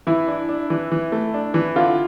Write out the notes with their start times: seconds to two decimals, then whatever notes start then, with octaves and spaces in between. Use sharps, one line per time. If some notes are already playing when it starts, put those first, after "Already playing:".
0.07 E3 E4
0.28 D4
0.49 D4
0.70 E3
0.92 E3
1.12 A3
1.34 D4
1.54 E3
1.76 D3 F4